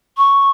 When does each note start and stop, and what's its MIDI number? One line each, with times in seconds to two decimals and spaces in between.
0.17 0.51 85